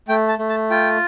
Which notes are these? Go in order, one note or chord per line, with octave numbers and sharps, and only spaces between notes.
A3 G5
A5
A3
A5
F4 G5